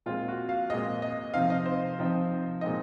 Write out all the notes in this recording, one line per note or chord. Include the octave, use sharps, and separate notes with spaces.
A#2 G#3 C4 F4
F#4
F5
A#2 G#3 C4 D#5
D#5
C3 F3 C4 D#4 F5
D#5
C5
C3 F3 C4 D#4
A#2 G#3 C4 D#4 D#5